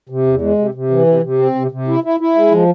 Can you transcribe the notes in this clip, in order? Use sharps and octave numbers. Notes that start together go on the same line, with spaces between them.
C3
E2
G#3
C3
C3
E3
C3
C3
C4
C3
C3
E4
E4
E4
G#3
F3